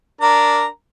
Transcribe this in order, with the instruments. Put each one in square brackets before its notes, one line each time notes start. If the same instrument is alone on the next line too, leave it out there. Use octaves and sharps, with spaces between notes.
[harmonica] D4 A#4 A#5